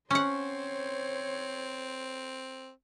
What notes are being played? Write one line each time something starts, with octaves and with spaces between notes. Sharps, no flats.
C4 C#4 C5 C#5 F#5